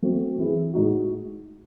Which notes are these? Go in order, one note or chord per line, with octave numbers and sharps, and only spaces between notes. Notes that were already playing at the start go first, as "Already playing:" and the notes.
F#3 A3 C4 F#4
E3 C4 E4 G#4
A2 G#3 D#4 F#4